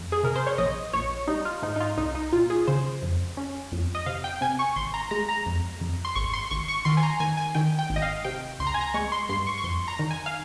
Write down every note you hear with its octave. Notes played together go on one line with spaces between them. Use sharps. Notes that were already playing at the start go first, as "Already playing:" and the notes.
Already playing: F2
G#4
C3 A#4
C5
C#5
A#1 D#5
A#1 C#5
G3 D#4
F4
G#2 D#4
D#4
F4
C2 D#4
D#4
A#2 F4
G#4
C#3 C5
F2
C#4
F2
D#5
C3 F5
G5
C3 G#5
C#6
G#1 C6
A#5
G#3 A#5
A#5
F2
F2
C6
G#1 C#6
C6
G#1 C#6
C#6
D#3 C6
G#5
A#5
D#3 G#5
G#5
D#3 G5
G5
G#1
D#5
F5
C3 G5
C#2 C6
A#5
G#5
A#5
G#3 C#6
C6
G2 C6
C#6
C#6
F2 C6
A#5
D#3
G#5
F5